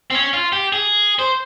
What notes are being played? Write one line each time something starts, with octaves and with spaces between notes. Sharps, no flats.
C4
C#4
F4
G4
G#4
C5